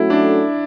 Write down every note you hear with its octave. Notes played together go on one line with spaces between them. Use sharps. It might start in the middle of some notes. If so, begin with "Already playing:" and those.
Already playing: F#3 A3 C#4 E4 F#4 A4
D4